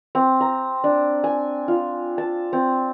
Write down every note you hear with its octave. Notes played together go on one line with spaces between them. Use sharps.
C4
A#5
D4
G#5
F4
A5
C4